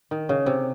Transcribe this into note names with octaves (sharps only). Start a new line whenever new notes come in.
D#3
C#3
C3